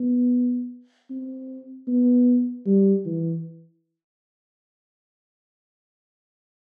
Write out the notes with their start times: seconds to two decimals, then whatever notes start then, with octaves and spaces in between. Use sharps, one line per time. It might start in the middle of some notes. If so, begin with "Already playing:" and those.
Already playing: B3
1.10 C4
1.88 B3
2.66 G3
3.06 E3